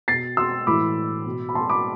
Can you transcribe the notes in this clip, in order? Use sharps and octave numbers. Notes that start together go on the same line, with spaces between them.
B2 A6 C7
C6 E6
A2 E3 B5 D6
B2
B5
A5 C6
B5 D6